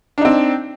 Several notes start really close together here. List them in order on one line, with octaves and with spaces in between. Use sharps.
D4 D#4 C4